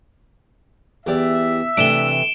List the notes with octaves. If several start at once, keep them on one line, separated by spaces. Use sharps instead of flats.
E2 G4 D5 E5
C3 E3 A3 D4 D7 E7 G7